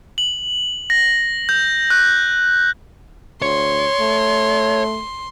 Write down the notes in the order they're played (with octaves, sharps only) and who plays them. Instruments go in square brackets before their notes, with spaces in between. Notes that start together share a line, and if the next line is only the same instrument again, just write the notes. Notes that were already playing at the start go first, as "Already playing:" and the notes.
[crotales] F#7
A#6
G6
F#6
[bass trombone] D2 [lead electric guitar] C#5 [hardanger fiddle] C6
[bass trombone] A3